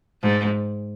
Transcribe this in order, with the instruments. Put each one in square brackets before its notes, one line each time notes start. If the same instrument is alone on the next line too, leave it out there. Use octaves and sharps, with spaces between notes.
[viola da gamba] G#2